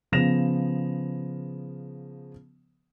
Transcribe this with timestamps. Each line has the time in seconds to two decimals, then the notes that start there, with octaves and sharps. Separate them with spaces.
0.12 C#3 F3 B3 A#6 E7 F7